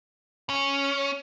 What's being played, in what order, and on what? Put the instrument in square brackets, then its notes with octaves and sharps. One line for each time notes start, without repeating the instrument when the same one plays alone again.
[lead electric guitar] C#4